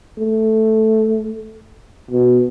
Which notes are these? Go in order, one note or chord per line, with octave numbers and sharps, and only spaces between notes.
A3
B2